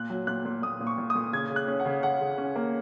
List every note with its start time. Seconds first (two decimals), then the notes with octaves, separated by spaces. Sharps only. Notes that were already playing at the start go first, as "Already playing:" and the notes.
Already playing: A#2 F#6
0.10 F#3
0.27 A#2 F#6
0.45 A#2
0.62 A#2 D#6
0.80 A#2
0.87 C#6
0.98 A#2
1.10 D#6
1.15 A#2
1.33 C#3 G#6
1.50 C#3
1.56 F#6
1.68 C#4
1.80 F#5
1.85 C#3
2.03 C#3 F#5
2.21 C#3
2.38 C#4
2.56 A#3